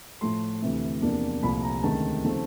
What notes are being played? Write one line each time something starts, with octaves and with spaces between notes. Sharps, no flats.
A2 F3 A3 C6
D2 C3 E3
E2 C3 F3 A#3 D4
C2 A#2 F3 A3 B5
A#5
D2 C3 D#3 G#3 C#4 A5
C#3 F3 A3 C4 D#4